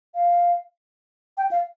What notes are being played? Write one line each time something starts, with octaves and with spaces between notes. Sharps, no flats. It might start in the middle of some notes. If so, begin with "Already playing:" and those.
F5
G5
F5